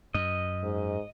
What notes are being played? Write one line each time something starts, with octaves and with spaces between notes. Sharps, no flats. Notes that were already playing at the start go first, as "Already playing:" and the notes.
F#2 D#5
G#2